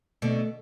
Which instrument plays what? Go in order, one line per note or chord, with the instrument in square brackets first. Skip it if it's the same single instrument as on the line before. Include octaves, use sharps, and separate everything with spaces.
[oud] B2 D3 [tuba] A3